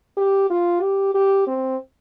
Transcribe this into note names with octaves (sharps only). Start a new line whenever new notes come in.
G4
F4
G4
G4
C4